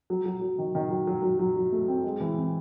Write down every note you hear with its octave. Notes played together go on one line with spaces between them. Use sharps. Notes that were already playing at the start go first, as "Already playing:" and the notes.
F#3
F#3
F#3
D#3
D#3
F#3
F#3
F#3
F#3
F#3
A3
C4
G#3
E3
C4